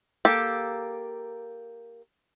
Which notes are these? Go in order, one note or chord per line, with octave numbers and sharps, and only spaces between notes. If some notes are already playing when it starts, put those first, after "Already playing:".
A#3 G4 A4